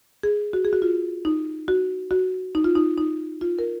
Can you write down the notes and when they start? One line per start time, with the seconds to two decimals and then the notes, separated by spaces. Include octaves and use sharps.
0.23 G#4
0.53 F#4
0.65 G#4
0.73 F#4
0.82 F4
1.25 D#4
1.68 F#4
2.11 F#4
2.55 D#4
2.64 F4
2.75 D#4
2.98 D#4
3.41 F4
3.59 A#4